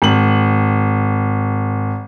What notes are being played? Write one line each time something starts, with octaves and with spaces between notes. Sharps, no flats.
G#1 F#7